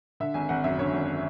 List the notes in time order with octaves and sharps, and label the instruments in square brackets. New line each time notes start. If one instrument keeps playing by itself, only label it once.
[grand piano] D3 E5
G#1 G#5
G#1 F#5
F#2 E5
D3 C#5
G#1